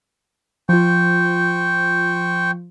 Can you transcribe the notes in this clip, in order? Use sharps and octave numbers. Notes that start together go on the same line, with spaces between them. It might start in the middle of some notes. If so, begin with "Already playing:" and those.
F3 F4 C5 G5 C#6